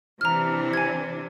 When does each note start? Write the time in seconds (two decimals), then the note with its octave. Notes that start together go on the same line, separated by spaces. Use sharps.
0.21 C3 E3 D4 A#5 F6
0.73 G#5 G#6